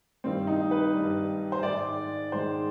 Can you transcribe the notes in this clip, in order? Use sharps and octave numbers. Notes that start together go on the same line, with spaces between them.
G2 D#3 G3 C4
D#4
B4
G2 D#3 G3
C5
G#2 D#3 G#3 D5
G#2 D#3 G#3 C5